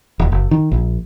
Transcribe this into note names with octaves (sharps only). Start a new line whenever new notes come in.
D#1
F#1
D#3
A#1